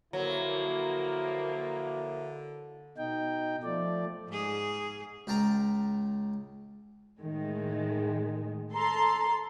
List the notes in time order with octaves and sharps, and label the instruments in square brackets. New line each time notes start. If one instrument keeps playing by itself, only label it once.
[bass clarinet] D3 [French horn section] F3 A#3 E4 [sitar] F#3
[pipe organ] B2 D#4 G5
F3 A3 D5
[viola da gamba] G#2 G#4
[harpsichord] C#2 G5 A5 A#5
[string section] A2 D#3 G#3
[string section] A4 C6 [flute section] A#5